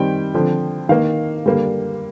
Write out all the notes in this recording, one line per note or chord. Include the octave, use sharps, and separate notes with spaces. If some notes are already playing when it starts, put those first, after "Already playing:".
Already playing: D#3 G3 C4 G5
D3 F3 C4
D#3 A#3 F5
D3 G3 A#3